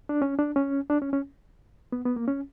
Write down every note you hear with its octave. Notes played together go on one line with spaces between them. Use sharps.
D4
C#4
D4
C#4
D4
C#4
C#4
B3
B3
A#3
C#4